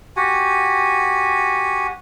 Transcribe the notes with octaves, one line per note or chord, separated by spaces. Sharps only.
F#4 G4 F#5 G#5